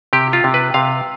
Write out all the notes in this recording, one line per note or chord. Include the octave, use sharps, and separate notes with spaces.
C3 G4
F4
C3
B4
C3 F5